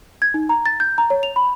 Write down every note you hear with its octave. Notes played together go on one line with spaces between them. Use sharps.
G#6
D#4
A#5
A6
G6
A#5
C#5
F7
B5